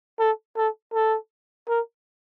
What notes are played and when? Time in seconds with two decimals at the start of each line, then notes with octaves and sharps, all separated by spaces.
0.19 A4
0.57 A4
0.94 A4
1.69 A#4